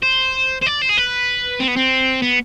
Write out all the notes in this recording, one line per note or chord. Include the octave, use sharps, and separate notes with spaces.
C5
C5
D5
C5
G#4
B4
C4
B3
C4
B3